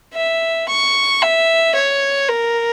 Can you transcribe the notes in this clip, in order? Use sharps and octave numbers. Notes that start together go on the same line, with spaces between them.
E5
C#6
E5
C#5
A#4